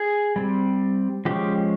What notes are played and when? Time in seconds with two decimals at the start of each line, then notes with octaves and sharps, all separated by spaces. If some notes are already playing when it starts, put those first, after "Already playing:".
Already playing: G#4
0.36 G3 C4
1.25 F3 G#3 C#4 G4